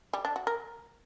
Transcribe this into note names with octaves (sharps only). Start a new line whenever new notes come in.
G3
D4
F#4
A#4